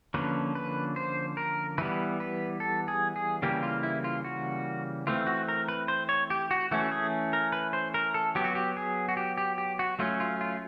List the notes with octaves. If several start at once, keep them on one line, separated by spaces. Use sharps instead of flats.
D3 F3 A#3 C#4 B4
B4
C5
A#4
E3 G3 B3 B4
B4
A4
G#4
G#4
C#3 E3 G3 A#3 G4
F4
E4
F4
F#4
E3 A3 C4 F4
F#4
A#4
B4
C5
C#5
G4
F#4
E3 A3 C#4 F#4
G#4
A#4
B4
C5
A#4
A4
F#3 B3 G4
F#4
G4
G#4
F#4
G4
G4
G4
F#4
F#3 A3 C#4 F4
F4
F4